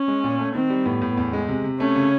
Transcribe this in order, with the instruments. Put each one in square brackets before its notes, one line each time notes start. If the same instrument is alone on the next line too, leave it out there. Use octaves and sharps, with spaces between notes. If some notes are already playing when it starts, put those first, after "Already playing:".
Already playing: [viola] C#4
[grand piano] G#3
A#2
A3
[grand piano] D#3 [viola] C4
[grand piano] G3
[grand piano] A2 [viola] B3
[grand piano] A2
E2
G#3
C3
C3
[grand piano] A3 [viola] C#4
[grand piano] C#3